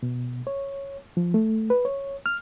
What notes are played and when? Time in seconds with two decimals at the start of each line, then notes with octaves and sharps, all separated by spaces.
0.03 B2
0.47 C#5
1.17 F3
1.34 A3
1.70 B4
1.85 C#5
2.26 F6